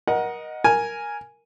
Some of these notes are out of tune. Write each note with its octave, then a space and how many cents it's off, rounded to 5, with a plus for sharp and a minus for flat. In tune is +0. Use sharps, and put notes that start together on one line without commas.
A#4 +30 D#5 +0 F#5 +0
A#4 +0 G#5 +0